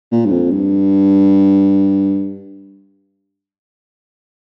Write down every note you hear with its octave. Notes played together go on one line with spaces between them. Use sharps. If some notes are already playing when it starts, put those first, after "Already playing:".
A#2
G2
F2
G2